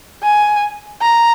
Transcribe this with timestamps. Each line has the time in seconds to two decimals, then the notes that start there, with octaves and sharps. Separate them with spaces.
0.23 G#5
1.02 A#5